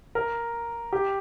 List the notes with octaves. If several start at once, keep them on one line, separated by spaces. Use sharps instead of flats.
A#4
G4